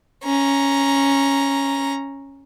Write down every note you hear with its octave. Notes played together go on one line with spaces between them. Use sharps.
C#4 A#5